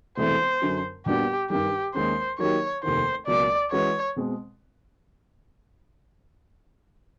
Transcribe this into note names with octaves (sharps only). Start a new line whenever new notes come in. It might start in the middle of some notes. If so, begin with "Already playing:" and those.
E1 E2 C3 E3 A3 C5
F#2 D3 F#3
A#2 G3 B3 D4 F#4 G4
G2 D#3 G3 G4
D#2 D#3 G#3 C#4 C5
D#3 F#3 A#3 D#4 G4 C#5
F1 D#2 D#3 C5
C#2 B2 F#3 A#3 D5
E3 G#3 C#4 F#4 B4 C#5
B2 G#3 C4